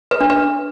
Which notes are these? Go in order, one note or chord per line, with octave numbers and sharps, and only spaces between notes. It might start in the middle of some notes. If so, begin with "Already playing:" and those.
B4
D4
B4